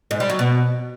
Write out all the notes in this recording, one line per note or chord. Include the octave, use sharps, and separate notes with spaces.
G#2
G3
F#3
B2